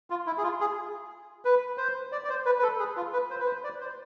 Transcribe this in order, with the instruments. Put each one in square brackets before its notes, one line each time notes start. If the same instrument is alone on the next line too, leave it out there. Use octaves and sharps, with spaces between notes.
[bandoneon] F4
E4
G#4
F4
G#4
B4
C5
D5
D5
C5
B4
B4
A4
G#4
F4
B4
C5
B4
C5
D5
C5